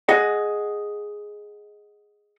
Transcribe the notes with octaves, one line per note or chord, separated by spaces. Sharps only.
G#4 D#5 F#5